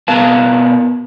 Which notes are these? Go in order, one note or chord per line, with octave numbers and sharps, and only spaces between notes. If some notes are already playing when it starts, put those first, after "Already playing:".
B2 B3 A#4 F5 A5